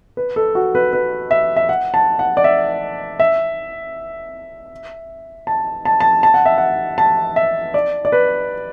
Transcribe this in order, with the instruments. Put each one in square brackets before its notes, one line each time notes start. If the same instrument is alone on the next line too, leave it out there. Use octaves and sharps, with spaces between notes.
[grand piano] B4
A4
F#4
B4
B4
E5
E5
F#5
A5
F#5
D5
E5
E5
A5
A5
A5
A5
F#5
E5
F#5
A5
E5
D5
D5
B4